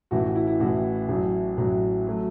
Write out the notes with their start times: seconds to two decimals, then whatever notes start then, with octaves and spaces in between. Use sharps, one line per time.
0.11 A1 A2 E3 F#4
0.23 F#4
0.36 E4
0.47 E4
0.60 A1 A2 E3 F#4
1.08 A1 A2 F#3
1.57 A1 A2 F#3
2.07 F#3 A3